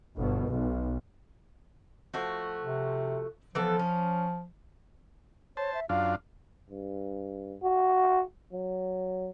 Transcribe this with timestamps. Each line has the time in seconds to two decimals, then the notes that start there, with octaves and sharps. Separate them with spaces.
0.16 G1 B2
0.48 B1
2.14 F3 A3 F#4
2.63 C3
3.55 E3 F3 B3 A4
3.79 C#4
5.57 C5 C#5 A5
5.74 E5
5.89 F#2 D4 F4 F5
6.70 G2
7.63 F#4
8.53 F#3